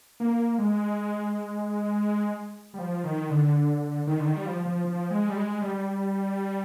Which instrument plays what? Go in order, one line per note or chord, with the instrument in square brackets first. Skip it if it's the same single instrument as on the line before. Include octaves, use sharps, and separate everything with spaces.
[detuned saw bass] A#3
G#3
G3
F3
D#3
D3
D#3
D3
D#3
G3
F3
F3
F3
G#3
G3
G#3
G3